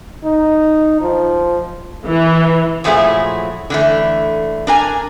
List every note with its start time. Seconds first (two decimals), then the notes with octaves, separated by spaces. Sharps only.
0.25 D#4
1.01 F3
2.07 E3
2.84 A#2 F3 F#3 A3 E4 G#4
3.70 D3 E3 A3
4.67 D4 A#4 G#5